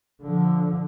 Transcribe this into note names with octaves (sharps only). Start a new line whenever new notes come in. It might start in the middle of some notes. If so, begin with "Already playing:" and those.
D3 F3